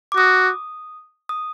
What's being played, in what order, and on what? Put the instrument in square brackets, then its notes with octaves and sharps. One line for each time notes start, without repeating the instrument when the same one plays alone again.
[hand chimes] D6
[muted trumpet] F#4 [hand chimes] D#6
[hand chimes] D#6